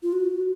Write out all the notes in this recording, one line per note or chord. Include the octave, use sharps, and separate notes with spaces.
F4
F#4